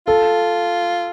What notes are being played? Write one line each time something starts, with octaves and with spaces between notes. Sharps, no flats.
F4 A4